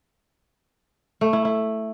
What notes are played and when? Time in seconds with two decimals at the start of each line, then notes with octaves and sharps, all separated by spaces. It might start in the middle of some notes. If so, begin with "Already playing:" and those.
1.21 A3
1.33 E4
1.45 E4